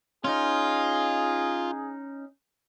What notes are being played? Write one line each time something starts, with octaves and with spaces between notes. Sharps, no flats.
C#4 D#4 F4 G#4